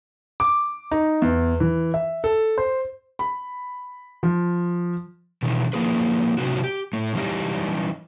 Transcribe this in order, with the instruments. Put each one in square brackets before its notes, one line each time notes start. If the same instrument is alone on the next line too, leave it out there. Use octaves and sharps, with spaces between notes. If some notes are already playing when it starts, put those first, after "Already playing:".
[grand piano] D6
D#4
E2
E3
E5
A4
C5
[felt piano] B5
F3
[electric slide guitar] B2 D#3 E3
F3 A#3 E4 G#4 B4
A2 C3 B3 C4 D#4 F#4
G4
A2 A3
E3 G3 D#4 G4